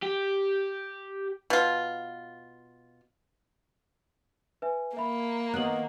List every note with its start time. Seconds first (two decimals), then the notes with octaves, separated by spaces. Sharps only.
0.03 G4
1.50 B2 F4
4.62 B4 E5 G#5
4.97 A#3 E5 B5
5.54 D#3 B3 F#6 F#7